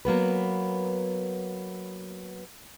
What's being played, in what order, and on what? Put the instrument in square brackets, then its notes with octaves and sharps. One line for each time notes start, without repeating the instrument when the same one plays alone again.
[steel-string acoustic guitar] F#3 A#3 B3 B4